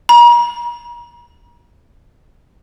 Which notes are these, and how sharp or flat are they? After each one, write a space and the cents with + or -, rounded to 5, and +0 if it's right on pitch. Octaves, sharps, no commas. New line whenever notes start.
A#5 +40